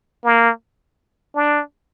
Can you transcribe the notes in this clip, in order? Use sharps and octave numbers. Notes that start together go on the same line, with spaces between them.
A#3
D4